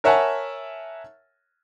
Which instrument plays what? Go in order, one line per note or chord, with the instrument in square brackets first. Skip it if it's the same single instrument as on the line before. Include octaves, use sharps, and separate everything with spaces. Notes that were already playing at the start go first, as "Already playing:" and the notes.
[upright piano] A#4 C#5 E5 F#5 G#5 A5